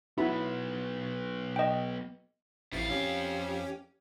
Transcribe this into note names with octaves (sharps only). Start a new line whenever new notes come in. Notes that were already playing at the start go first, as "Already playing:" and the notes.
F#3 B3 E4 F#4 B5
D#5 G5
A1 F2 E4 F5 A6
C#4 G4